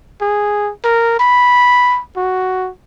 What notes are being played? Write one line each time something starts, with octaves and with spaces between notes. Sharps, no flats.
G#4
A#4
B5
F#4